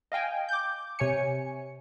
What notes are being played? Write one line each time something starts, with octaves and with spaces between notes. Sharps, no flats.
D#5 F5 G5 G#5
D6 G6
C3 C#5 G#5 C#7